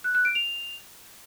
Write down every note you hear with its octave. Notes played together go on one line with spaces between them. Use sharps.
F#6
F#6
D7
F7